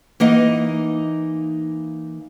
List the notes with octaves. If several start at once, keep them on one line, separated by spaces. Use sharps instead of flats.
E3 A#3 D#4 D#5 F#5